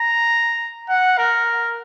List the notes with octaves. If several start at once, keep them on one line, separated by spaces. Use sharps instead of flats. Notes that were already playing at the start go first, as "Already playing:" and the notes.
Already playing: A#5
F#5
A#4